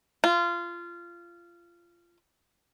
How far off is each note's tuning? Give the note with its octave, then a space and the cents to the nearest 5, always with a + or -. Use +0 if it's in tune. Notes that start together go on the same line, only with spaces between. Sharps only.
F4 -20